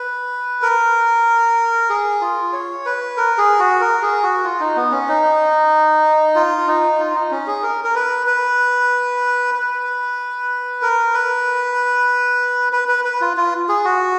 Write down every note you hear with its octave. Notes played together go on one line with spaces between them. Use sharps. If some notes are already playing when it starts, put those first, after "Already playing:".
Already playing: B4
A#4
G#4
F4
C#5
B4
A#4
G#4
F#4
A#4
G#4
F#4
F4
D#4
B3
C#4
D#4
F4
D#4
F4
D#4
C#4
G#4
A#4
A#4
B4
B4
B4
A#4
B4
B4
B4
B4
F4
F4
G#4
F#4